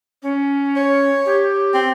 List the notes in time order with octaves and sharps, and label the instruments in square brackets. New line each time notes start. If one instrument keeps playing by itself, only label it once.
[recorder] C#4
[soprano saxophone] C#5
[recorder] G4
[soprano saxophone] C4